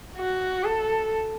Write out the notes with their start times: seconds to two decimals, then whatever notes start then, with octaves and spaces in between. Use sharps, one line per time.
0.17 F#4
0.64 A4